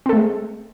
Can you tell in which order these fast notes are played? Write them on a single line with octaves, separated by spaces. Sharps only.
C4 A4 A3 G#3